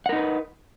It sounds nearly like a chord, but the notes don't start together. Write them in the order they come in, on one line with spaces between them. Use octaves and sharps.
F#5 A#4 D#4 B4